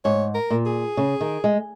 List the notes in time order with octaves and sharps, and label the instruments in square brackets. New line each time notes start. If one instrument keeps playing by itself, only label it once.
[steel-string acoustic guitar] G#2 [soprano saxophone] C#5
[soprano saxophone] A#4
[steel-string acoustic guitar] A#2
[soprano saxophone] G#4
[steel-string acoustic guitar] C#3
D#3
G#3